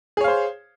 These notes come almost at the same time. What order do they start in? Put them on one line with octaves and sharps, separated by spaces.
G#4 C#5 F5 C5